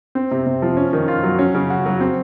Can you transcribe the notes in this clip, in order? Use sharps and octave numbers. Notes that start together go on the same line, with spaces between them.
C4
C3
C3
F3
C#4
D#3
F4
F#3
C#4
C#3
F#4
F#3
C4